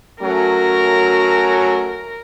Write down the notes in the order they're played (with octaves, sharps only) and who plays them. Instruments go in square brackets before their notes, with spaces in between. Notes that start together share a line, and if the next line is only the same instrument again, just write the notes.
[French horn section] F#3 A3 C#4 [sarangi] A#4